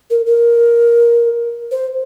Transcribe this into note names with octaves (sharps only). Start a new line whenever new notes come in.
A#4
A#4
C5